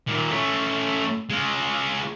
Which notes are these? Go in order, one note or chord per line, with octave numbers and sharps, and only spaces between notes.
D#2 A#2
A3 C#4
G#3 F4